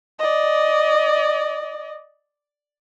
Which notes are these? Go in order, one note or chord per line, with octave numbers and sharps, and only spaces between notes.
D5 D#5